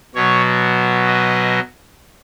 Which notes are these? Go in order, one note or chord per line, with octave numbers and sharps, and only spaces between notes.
B2 F#3 B3 C#5
D#5